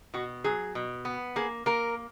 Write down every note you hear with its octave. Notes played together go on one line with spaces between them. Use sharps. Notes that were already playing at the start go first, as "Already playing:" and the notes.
B2 F#4
F#3 G#4
B2
B3
A#3 G#4
A#3 A#4